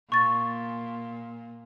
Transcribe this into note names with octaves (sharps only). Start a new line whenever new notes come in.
A#2 C#6 A6